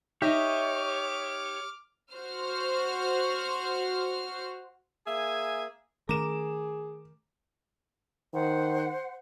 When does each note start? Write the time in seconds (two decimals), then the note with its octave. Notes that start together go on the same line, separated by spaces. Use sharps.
0.22 D#4 G4 C#5 D#5 E5 D6 F6
2.14 F#4 C5 F6
5.07 A#3 G#4 E5 G#5
6.09 D#3 A3 C#4 G#4 A#4 D6 E7
8.33 D#3 C5 F#5